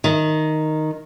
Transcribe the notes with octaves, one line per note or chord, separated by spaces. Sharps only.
D#3